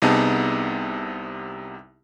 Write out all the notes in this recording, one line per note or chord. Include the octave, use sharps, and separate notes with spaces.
C2 C3 B3 D#4 G#4 A5